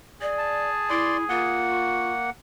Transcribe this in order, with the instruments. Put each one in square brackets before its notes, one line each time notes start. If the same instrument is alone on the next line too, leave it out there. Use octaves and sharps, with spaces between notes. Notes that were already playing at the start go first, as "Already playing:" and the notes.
[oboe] G#4 [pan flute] D5
[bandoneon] A5
[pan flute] E4 [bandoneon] D5 C6
[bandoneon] A#3 F#5 [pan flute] F4
[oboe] C#6